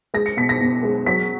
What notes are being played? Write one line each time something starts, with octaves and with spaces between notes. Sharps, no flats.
G#3 A#6
C#7
B2 B6
A#6
B2
G#3
F#3 B6